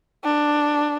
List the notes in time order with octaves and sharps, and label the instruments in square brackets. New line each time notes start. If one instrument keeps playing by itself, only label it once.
[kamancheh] D4